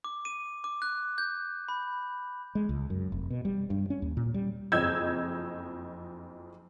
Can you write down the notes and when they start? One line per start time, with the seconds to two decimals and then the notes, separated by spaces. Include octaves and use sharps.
0.04 D6
0.25 D#7
0.64 D6
0.82 F#6
1.18 G6
1.68 B5
2.55 G#3
2.69 C#2
2.90 F#2
3.12 F1
3.30 B2
3.45 G3
3.70 G2
3.90 C#4
4.02 D#2
4.17 A#2
4.34 G3
4.72 F#1 F2 D#5 E6 G6 G#6